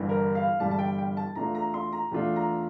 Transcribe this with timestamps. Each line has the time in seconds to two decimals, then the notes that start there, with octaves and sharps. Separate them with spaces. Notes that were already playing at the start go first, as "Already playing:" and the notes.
Already playing: G1 G2 E3 G3
0.09 A#4
0.35 F5
0.60 G1 G2 E3 G3 A5
0.71 A5
0.79 G5
0.98 G5
1.17 A5
1.35 E2 E3 A3 D4 F4 A#5
1.55 A#5
1.74 C6
1.93 A#5
2.11 E2 E3 A3 D4 F4
2.36 A#5